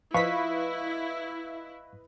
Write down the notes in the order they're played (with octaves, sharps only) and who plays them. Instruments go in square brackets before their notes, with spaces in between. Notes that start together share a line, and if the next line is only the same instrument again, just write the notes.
[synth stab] F3 B6 [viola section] E4 [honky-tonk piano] B4 D#5 [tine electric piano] F5 C#6